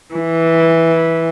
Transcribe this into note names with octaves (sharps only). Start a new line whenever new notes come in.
E3